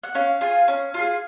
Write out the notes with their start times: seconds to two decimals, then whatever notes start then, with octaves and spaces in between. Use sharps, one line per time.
0.03 F#5
0.15 C#4 F5
0.41 F4 G#4
0.68 C#4
0.94 F4 G#4